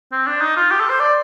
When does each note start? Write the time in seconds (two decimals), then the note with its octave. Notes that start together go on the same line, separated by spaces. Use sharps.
0.12 C4
0.27 D4
0.41 D#4
0.56 F4
0.71 G4
0.80 A4
0.90 C5
1.00 D5